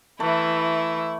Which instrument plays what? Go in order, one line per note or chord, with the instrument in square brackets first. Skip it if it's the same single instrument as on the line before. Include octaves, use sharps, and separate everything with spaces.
[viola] E3 [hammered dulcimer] A3 [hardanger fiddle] E4